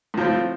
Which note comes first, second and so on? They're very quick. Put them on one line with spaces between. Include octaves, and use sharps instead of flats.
A2 F3 C4